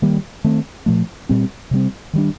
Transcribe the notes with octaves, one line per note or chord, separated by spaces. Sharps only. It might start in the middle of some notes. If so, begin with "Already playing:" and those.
D#3 G3 A#3
D#3 A3 C4
A#2 F3 A3
A#2 G3 C4
C3 G3 C4
D#3 G3 D4